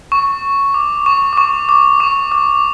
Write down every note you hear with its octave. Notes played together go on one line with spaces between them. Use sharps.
C#6
D6
C#6
D6
C#6
D6
C#6
D6